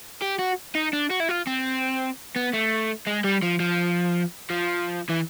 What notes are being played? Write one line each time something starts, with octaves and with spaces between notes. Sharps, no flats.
G4
F#4
D#4
D4
F#4
E4
F4
C4
B3
A3
G#3
G3
F3
F3
F3
E3